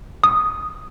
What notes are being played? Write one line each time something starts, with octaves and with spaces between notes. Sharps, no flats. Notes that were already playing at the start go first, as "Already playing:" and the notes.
D#6